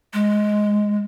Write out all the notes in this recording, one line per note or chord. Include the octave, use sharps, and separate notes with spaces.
G#3